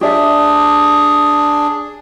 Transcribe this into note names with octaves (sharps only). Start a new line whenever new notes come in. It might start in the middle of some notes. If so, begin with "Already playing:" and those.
D4 G4 G#4 D5 E5